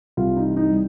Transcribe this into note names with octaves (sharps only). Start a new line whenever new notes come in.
C2 F4
D#4
E3
D#4
G3